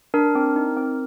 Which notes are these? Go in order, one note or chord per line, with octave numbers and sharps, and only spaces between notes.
D4 A#4
C4
D#4
C4